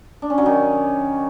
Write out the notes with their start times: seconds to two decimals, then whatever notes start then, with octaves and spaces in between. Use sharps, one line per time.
0.22 D4
0.30 C#4
0.38 F#3
0.46 D#3